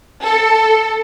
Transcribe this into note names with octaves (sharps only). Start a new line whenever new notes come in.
A4